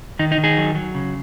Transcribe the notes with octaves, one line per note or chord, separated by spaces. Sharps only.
D#3 D#4
D#4
D#3
D#4 G#4
F#3
F#3
C#3